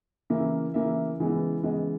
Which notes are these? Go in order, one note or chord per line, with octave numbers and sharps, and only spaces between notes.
C#3 E3 A#3 E5
C#3 E3 A#3 E5
C#3 E3 G#3 B3
C#3 E3 G#3 B3 D#5